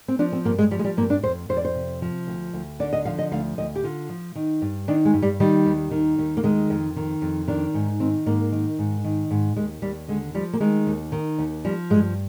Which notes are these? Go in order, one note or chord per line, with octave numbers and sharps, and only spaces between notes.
C4
F3 D4
C4
G2 A#3
G#3
F3 G3
G#3
G3
G2 A#3
D4
F2 C5
F2 C5
D5
C5
C3
F3
D2
D2
D3 D5
D#5
F3 F5
D#5
D2 F5
D2 D#5
G4
D3 F4
F3
D#3
G2
D#3 D4
G#3
G2
G3
D#3 G3
D#2
D#3
D#2
A#3
D#3 G#3
F2
D#3
F2
D#3 D4
G#2
D#3 C4
G#2 A#3
D#3
G#2
D#3
G#2
D#2 G#3
D#2 G3
D3 G#3
F3 G3
A#3
D#3 G#3
D#2
D#3
D#2
F3 G3
G2 G#3